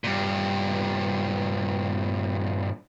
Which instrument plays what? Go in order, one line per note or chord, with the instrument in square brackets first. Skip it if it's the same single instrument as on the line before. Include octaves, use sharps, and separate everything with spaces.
[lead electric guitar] G2 A#2